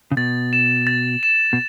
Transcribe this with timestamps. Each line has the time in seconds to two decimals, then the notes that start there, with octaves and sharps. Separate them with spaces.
0.11 C#3
0.17 B2 A6
0.53 E7
0.87 A6
1.23 E7
1.53 B2